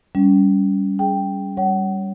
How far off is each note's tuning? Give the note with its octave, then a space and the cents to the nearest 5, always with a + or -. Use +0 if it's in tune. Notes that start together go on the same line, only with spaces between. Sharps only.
G3 +0 C#4 +25
G#4 +0 G5 +0
G3 +0 C#5 +5 F#5 +30